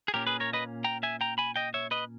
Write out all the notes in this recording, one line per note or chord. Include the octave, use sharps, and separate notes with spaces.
G#4
A#2 A#3 C#4 G4 A#4
G#4 B4
A#4 C#5
B4 D#5
G5 A#5
E5 G#5
G5 A#5
G#5 B5
D#5 G5
C#5 E5
B4 D#5